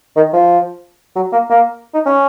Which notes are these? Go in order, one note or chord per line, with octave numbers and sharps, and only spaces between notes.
D#3
F3
F#3
A#3
A#3
D#4
C#4